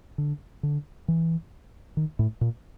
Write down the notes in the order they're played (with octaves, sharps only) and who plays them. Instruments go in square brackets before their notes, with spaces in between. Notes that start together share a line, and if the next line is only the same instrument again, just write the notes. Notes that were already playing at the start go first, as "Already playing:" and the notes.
[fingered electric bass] D3
D3
E3
D#3
A2
A#2